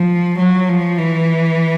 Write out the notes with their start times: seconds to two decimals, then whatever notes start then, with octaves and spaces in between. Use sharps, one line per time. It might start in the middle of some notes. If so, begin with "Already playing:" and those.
Already playing: F3
0.38 F#3
0.68 F3
0.98 E3